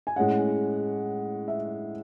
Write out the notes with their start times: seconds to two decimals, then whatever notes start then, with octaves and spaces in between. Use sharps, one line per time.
0.07 G#5
0.16 A2 G#3 C#4 F#5
1.48 E5